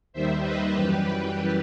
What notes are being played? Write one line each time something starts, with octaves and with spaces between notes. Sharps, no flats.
D#2 D#3 G3 C5 E5
B4 D#5
F#2 E3 G3 G4 B4